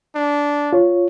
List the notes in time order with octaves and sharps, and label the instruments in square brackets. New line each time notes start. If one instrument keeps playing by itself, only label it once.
[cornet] D4
[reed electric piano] F4 C#5